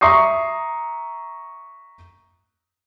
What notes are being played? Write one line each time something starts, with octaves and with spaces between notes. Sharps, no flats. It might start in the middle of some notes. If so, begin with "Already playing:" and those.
E5 A#5 C#6 D#6 C7